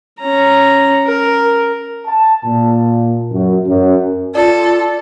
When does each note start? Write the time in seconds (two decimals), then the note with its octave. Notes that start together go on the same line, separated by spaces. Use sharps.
0.20 C#4 A#5
1.06 A#4
2.06 A5
2.45 A#2
3.32 F#2
3.67 F#2
4.35 F4 A4 D5